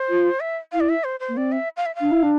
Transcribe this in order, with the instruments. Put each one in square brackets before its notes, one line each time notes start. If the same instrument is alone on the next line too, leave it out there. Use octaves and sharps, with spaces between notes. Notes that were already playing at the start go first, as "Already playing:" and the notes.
Already playing: [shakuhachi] C5
[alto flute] F4
[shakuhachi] E5
[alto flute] E4 [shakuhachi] F5
[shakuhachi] D5
E5
C5
C5
[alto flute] A#3
[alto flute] C4 [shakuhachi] D5
[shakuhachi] E5
F5
E5
[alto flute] D4 [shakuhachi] F5
[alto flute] E4
D4